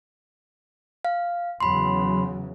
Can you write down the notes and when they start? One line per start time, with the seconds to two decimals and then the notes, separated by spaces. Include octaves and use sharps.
1.05 F5
1.60 E2 C#3 F#3 B5 C6